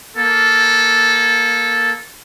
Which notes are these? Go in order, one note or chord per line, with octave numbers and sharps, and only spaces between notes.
A#3 A4